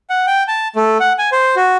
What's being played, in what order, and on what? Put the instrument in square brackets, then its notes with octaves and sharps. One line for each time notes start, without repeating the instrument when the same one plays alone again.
[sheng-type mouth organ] F#5
G5
A5
A3
F#5
G#5
C5
F#4